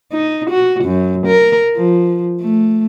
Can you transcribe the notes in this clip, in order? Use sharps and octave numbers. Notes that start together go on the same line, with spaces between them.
D#4
F#4
F#2
A#4
F3
A3